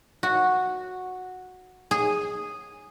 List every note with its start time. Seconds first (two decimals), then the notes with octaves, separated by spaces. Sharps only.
0.23 F#4
1.91 G#4